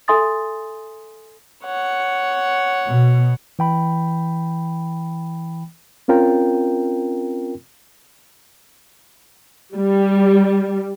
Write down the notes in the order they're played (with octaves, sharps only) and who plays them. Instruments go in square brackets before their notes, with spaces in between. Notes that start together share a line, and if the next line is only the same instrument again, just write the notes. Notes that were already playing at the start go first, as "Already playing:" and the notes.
[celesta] A4 E5 G#5 C6 D#6 A6
[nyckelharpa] C#5 F#5
[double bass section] B2
[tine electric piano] E3 G5 B5
[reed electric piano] C4 C#4 F4 A#4 G5
[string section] G3